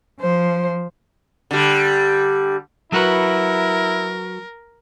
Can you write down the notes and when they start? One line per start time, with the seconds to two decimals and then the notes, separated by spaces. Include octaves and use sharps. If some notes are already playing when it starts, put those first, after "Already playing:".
0.18 F3 C5
1.51 D3 G3
2.92 F#3 E4 F#4 A#4 B4